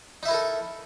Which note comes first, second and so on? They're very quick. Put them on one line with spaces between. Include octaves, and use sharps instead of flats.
D#4 E5 E4 A#4 A4